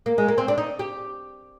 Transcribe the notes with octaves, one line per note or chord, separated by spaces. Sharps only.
A#3
G#3
A#3
C4
D4
D#4
G4